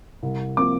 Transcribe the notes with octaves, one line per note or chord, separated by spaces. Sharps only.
C2
C3 F3 A#3 D6